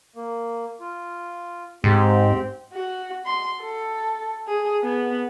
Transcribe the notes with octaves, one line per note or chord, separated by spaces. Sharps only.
A#3
F4
G#2 C4 G4
F#4
C6
A4
G#4
B3